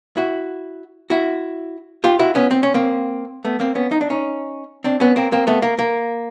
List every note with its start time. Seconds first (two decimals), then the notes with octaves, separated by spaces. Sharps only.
0.17 E4 F#4
1.10 E4 F#4
2.04 F4 G4
2.19 E4 F#4
2.35 B3 C#4
2.51 C4
2.63 C#4
2.74 A#3 C4
3.45 A3 B3
3.60 A#3 C4
3.75 B3 C#4
3.91 D#4
4.01 D4
4.10 C#4 D#4
4.84 C4 D4
5.00 B3 C#4
5.16 A#3 C4
5.32 A#3 C4
5.47 A3 B3
5.62 A#3
5.79 A#3